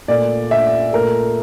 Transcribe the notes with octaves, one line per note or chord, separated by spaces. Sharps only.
A#2 A3 D5
E5
A#2 A3 A#4